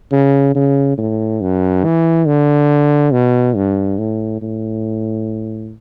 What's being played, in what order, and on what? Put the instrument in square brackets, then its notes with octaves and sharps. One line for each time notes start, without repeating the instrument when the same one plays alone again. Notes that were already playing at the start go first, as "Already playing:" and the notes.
[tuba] C#3
C#3
A2
F#2
E3
D3
B2
G2
A2
A2